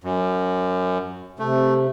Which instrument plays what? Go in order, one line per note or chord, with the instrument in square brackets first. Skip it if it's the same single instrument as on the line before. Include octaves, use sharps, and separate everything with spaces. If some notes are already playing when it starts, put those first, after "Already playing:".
[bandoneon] F#2
[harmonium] C3 [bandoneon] A3